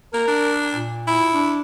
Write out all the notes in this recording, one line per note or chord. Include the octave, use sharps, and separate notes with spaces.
A#3 A#4
D4
A#2
E4
D4